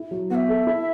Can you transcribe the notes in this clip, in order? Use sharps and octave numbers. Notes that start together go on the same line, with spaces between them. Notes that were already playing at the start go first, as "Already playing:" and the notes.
Already playing: E4
F#3
B3 E5 F#5
A4
E4